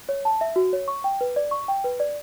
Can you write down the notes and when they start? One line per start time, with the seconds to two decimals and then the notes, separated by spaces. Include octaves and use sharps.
0.09 C#5
0.25 A5
0.41 E5
0.56 F#4
0.73 C#5
0.88 C#6
1.04 G5
1.21 B4
1.36 D5
1.51 C#6
1.68 G5
1.84 B4
2.00 D5